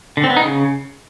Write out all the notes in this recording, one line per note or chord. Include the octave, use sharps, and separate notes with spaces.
D3
C4
B3
D#4
C#3